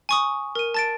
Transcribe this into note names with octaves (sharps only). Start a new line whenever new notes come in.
G#5 C#6 D#6
A#4 D#7
A5 A6 D7